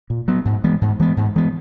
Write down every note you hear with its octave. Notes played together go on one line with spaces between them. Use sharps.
A#2
F#3 B3
G#2
E3 G#3 B3
G#2
E3 G#3 B3
G#2
E3 G#3 B3